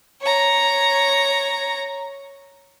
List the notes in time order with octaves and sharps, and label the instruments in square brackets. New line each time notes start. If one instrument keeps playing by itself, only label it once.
[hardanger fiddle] C#5 A#5